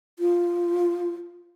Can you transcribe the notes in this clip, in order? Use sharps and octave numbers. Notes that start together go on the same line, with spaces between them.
F4